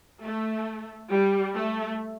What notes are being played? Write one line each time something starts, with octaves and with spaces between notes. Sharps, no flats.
A3
G3
A3